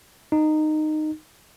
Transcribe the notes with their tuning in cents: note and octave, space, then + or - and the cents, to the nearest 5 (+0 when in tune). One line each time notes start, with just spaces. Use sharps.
D#4 -15